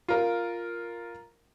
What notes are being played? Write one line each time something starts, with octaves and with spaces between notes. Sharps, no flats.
F4 A#4